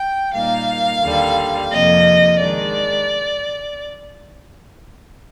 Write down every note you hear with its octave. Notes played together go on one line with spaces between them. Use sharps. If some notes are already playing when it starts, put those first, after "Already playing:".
Already playing: G5
A#2 G3 A#3 D#4 F5
D#2 D3 G3
F2 C3 F3 A#3 D#5
G#2 D#3 G#3 D4 D5